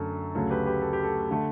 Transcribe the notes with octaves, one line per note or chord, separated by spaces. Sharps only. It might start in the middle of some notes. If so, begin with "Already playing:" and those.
Already playing: F#2 D3 A3 A4
D2 C#3 F#3 A4
G4 B4
G4 B4
A4
G4
A4
D3 A3